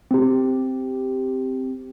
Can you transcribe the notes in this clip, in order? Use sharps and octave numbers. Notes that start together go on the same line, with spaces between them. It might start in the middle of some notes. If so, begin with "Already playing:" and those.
C4 G4